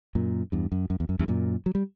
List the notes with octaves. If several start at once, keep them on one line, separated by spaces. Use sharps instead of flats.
F#2 A#2
E2 G2
F#2
F#2
E2
F#2
E2 G2
F#2 A#2
F#3
G3